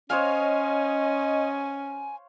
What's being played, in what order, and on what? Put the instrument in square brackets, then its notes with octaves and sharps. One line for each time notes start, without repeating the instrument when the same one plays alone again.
[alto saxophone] C#4 [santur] C5 C#5 F5 [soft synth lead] D#5 [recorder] G#5